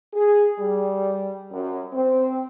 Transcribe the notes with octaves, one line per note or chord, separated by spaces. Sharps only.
G#4
G3
F#2
C4